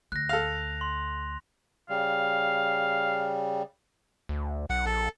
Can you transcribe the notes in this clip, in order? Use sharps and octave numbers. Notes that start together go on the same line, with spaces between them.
D2 F#6 A#6
A4 F5 F7
C6
C#3 G3 F5
D2
B1 F#5
A#1 A4